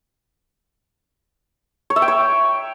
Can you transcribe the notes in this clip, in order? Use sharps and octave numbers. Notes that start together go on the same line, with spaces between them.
C#5
E5
G5
C#5